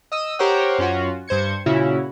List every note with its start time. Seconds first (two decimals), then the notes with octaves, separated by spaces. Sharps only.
0.12 D#5 D#6 E6 D#7
0.39 G4 A#4 C5 C#5 F#5
0.79 F#2 C#4 F4 F#4
1.28 G2 C5 G#6 C#7
1.66 A#2 C#3 C#4 E4 F#4